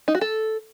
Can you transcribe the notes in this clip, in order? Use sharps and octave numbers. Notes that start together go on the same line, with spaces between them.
D#4
F#4
A4